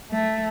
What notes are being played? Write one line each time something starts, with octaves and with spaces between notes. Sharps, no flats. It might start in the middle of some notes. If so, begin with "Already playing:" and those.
A3